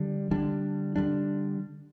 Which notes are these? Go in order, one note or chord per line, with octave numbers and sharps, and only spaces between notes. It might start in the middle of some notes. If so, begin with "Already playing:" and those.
Already playing: D3 G3 D4
D3 G3 D4
D3 G3 D4